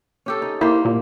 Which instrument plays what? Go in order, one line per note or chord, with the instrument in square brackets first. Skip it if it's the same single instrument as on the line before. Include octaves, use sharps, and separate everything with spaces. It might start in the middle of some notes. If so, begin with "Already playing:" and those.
[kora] C#4 G4 A4
D#4
[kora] A#3 G4 C5 [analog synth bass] E4
[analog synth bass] A#2